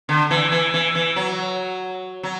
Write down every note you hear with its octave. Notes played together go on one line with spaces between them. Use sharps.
D3
E3
E3
E3
E3
F#3
F#3